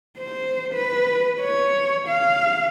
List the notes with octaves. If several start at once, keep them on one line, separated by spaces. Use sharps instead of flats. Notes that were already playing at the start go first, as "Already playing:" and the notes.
C5
B4
C#5
F5